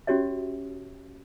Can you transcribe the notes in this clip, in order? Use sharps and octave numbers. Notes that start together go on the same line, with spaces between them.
C#4 F#4 G4 C#5 E5